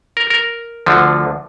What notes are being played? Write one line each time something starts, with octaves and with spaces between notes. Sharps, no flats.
A#4
A#4
D2 D3 F3